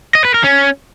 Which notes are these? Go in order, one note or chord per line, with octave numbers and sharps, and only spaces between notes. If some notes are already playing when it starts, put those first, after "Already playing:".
D#5
B4
A#4
C#4